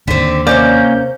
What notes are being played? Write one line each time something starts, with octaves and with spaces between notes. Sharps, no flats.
D#2 D3 C4 B6
C3 A#3 C#4 C5 D5 G6